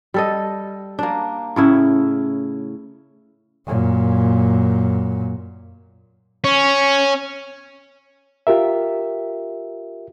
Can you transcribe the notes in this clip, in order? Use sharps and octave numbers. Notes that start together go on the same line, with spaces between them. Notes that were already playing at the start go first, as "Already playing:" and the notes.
G3 A4 D#5
A#3 D4
A2 C#3 E4
F#2 A#2
C#4
F4 G4 A#4 E5